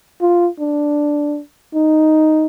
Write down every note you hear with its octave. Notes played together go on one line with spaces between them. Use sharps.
F4
D4
D#4